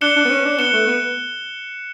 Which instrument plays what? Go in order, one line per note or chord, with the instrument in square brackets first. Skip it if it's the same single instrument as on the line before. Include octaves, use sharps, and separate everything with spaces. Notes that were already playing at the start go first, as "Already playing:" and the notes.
[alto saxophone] D4 [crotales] F#6 C#7 E7 G7
[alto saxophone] D4
B3
C#4
D4
[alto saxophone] B3 [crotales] F#6 C#7 E7 G7
[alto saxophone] A3
B3